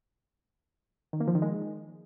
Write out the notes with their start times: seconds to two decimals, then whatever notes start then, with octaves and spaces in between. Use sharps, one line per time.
1.13 D#3
1.20 A#3
1.28 F3
1.35 D#3
1.42 G#3